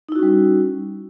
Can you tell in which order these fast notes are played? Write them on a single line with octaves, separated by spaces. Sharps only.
D#4 E4 F#4 C#4 G3